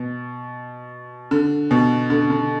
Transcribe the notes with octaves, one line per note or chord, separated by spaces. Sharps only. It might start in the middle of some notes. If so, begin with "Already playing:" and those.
Already playing: B2
D3
B2
D3
D3